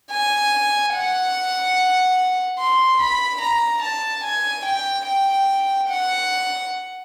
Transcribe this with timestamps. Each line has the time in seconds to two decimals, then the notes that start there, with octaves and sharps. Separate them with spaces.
0.12 G#5
0.94 F#5
2.59 C6
3.00 B5
3.42 A#5
3.82 A5
4.24 G#5
4.65 G5
5.07 G5
5.89 F#5